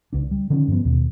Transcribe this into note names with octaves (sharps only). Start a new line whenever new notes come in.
C#2 D4
G3
D3 D#3 F3 C#4
G2 F3 B3
D#2 B2